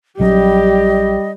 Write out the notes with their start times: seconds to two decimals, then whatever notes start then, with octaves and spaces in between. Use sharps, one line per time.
0.20 A#1 F#3 G3 C#4 G4 D#5